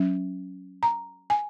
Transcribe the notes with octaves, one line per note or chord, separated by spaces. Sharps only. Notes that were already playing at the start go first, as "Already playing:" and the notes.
Already playing: F#3 C#4
A#5
G#5